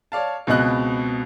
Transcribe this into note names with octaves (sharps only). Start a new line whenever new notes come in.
C#5 D5 F5 A5
C#2 B2 C4 D#5 F#6